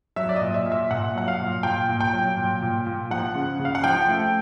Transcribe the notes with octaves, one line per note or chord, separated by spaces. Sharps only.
F#3 E5
D5
D#5
A#2
E5
A#2
E5
A#2 F#5
F#3 F#5
F5
A#2
A#2 G5
A#2
G5
F#3
A#2
A#2
A#2
F3 F#5
C#3
C#3
F5
F#5
F3 G5
A3